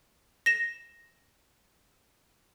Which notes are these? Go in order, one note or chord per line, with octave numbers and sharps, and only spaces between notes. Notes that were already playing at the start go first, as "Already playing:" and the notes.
A#6 E7